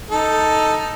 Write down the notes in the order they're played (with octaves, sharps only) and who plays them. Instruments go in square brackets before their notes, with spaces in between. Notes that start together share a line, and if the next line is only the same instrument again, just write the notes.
[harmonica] D#4 A4